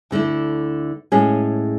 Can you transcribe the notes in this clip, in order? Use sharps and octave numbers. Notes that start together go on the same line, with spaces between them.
D2 D3 A3 E4
A2 G#3 C#4 G#4